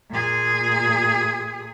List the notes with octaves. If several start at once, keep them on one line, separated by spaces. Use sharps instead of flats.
A#2 G#4